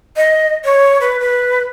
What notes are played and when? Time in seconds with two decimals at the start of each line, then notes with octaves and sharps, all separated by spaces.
0.17 D#5
0.65 C#5
1.01 B4
1.20 B4